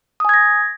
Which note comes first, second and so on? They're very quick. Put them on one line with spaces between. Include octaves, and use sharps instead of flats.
D#6 G#5 G#6 A#6